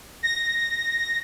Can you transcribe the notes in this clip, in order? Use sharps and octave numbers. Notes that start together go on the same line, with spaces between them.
A#6